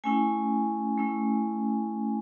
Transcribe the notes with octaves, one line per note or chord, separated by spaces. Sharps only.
A3 C#4 E4 G#5
A3 C#4 E4